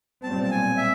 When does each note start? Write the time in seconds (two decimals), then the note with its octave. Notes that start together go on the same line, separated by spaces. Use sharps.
0.23 B1 A#2 G3 C4 A5
0.43 A5
0.51 G#5
0.78 E5